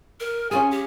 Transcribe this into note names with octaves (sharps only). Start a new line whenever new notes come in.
A#4
C#4 F4 G#4 G#5
G4